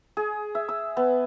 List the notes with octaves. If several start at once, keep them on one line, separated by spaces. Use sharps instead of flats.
G#4
E5
E6
B3